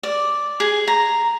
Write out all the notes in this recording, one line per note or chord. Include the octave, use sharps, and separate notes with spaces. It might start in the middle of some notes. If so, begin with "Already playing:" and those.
D5
G#4
A#5